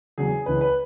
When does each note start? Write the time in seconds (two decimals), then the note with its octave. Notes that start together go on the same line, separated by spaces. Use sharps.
0.18 E2 C#3 F#3 G#4
0.46 C#2 C#3 E3 C#4 B4
0.61 B4